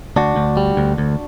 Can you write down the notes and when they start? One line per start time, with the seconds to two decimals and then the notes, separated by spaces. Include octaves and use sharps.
0.16 D2 D4 F#4
0.36 D2
0.57 G3
0.77 D2
0.98 D2